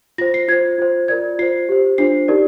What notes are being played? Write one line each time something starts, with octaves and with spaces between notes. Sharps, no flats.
F4 C5 A#6
C7
F4 C5 G#6
F4 C5
F4 A#4 D5 G#6
F4 C5 C7
G4 C5
D4 F4 C5 C7
D#4 G4 A#4 D5